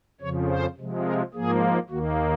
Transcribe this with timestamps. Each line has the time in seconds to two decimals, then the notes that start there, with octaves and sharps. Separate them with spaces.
0.21 F2 C#3 F3 C#5
0.49 C5
0.77 C3 F3 G#3
1.05 A#4
1.34 G#2 F3 A#3 G#4
1.90 D#2 D#3 A#3 F#4